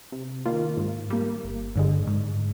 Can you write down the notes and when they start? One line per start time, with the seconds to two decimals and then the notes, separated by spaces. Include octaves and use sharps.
0.12 C3
0.46 D#3 A#3 F4
0.77 G#2
1.10 G3 A#3
1.43 G1
1.76 G2 D3 G#3
2.07 G#2